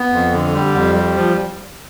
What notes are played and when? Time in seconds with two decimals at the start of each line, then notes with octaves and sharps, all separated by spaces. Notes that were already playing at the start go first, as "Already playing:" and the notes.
Already playing: B3
0.12 F2
0.33 D3
0.54 G3
0.74 F2
0.95 G3
1.15 F3